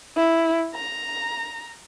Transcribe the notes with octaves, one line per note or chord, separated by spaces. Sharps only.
E4
A#5